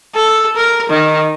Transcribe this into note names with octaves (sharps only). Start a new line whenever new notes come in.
A4
A#4
D#3